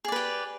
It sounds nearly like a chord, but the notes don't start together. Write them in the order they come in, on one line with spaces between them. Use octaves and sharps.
G#4 D5 B4 G4